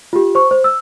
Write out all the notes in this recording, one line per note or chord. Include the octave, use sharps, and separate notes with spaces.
F4 G4
C5 C#6
C5
E6